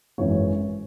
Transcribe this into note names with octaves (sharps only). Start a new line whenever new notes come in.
G#1 F#2 E3 G#3 C#5